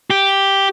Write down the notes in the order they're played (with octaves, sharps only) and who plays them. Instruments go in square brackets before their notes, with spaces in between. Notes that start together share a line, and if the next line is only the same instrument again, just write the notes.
[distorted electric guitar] G4